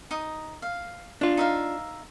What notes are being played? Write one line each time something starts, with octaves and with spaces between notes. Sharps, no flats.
D#4 D#6
F5
D4 F4
D#4 E5 F5